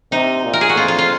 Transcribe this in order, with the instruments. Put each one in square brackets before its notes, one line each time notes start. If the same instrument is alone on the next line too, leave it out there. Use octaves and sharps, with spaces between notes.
[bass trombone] C3 [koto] D#4
[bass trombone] A#2
[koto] A#4
G#4
F#4
[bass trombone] F2 [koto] F4
[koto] F4
F4